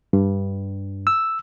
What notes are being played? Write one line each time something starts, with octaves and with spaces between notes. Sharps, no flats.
G2
E6